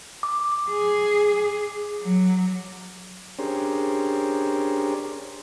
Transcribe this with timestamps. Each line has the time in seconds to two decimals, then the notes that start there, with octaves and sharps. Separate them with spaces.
0.23 D6
0.69 G#4
2.02 F#3
3.39 C#4 D4 G4 G#4 A#4 C5